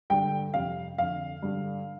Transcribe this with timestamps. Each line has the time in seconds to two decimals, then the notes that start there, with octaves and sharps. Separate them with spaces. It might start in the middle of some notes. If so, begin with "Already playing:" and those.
0.10 G2 D3 G5
0.54 F2 C3 F5
0.98 F2 D3 F5
1.42 G2 D3